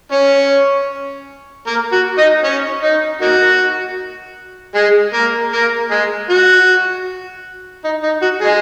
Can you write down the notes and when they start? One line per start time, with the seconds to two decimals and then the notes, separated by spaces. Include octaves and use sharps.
0.12 C#4 C#5
1.67 A#3 A#4
1.92 F#4
2.18 D#4 D#5
2.44 C#4 C#5
2.83 D#4
3.21 A#3 D#4 F#4
4.75 G#3 G#4
5.13 A#3 A#4
5.52 A#3 A#4
5.91 G#3 G#4
6.30 F#4
7.84 D#4
8.03 D#4
8.22 F#4
8.41 G#3 G#4